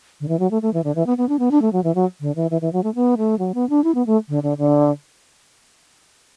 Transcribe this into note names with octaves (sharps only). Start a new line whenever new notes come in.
D3
E3
F#3
A3
A3
E3
D3
E3
B3
B3
D4
B3
D4
A3
F#3
E3
F#3
D3
E3
E3
E3
F#3
A3
B3
A3
F#3
B3
D4
E4
B3
A3
D3
D3
D3